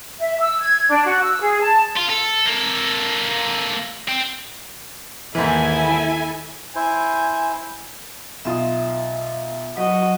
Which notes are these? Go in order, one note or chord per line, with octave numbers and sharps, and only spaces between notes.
E5
E6
G#6
D4
F#4
E6
G#4
A5
F4
A4
A#3 A4
C4
D#2 G#2 E3 A#3 E4 A4 G#5
E4 C5 G#5
B1 F4 E5 D#6
F#3 F#4 D#5